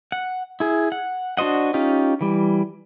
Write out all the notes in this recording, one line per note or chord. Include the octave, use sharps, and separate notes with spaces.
F#5
E4 G#4
F#5
D4 F#4 C5 D#5 F#5
C#4 D#4 F4 G4
E3 G3